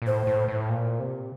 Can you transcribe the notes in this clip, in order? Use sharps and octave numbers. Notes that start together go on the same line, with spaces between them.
A#2
A2 C5
A2
A2
A#2
C3